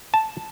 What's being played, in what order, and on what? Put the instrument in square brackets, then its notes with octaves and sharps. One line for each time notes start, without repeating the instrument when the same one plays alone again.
[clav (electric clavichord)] A5